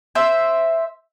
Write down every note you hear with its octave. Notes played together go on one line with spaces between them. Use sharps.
C5 E5